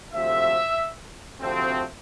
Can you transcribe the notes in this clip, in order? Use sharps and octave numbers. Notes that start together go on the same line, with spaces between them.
D2 C3 F3 A3 E5
D2 C3 F3 A3 C4